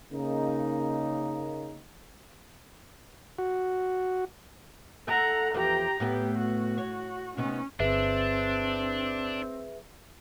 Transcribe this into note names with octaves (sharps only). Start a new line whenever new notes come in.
C#3 A#3 D#4
F#4
E4 A4 F#5 A#5
E2 F3 G4 B4 A#5
A2 B3 G4 B4
F#4
C#5
C3 B3 C#4 D#4
G1 C4 D4 G#4 B4 E5